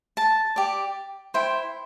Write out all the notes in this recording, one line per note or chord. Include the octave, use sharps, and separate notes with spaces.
A5
G4 D5
E4 C5 G5